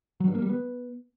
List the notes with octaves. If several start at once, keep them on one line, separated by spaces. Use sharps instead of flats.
F#3
G2
A#3
G3
B3